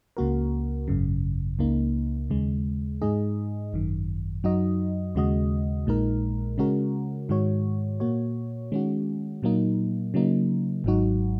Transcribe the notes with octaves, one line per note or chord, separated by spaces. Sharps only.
C#2 C#3 A#3 F#4 A#4
G#1 F#2 C#3
C#2 C#3 A#3 D#4
D#2 C#3 G#3
G#2 G#3 D#4 G#4 D#5
G#1 F#2 D#3
F#2 F#3 D#4 F#4 D#5
D#2 C#3 G#3 F#4 D#5
A#1 A#2 G#3 D#4 A#4
C#3 G#3 C#4 F#4 A#4
G#2 D#3 G#3 F#4 C#5
A#2 A#3 F#4 C#5
D#3 G#3 C#4 F#4
A#2 F#3 A#3 D#4
C#3 F#3 A#3 D#4
G#1 G#2 F#3 D#4 F#4